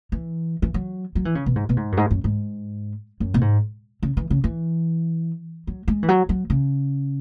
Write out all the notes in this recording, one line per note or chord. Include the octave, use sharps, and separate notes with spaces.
E3
E3
F#3
F#3
E3
C#3
B2
G#2
B2
G#2
F#2
G#2
F#2
G#2
F#2
B2
G#2
C#3
E3
C#3
E3
F#3
G#3
E3
F#3
F#3
C#3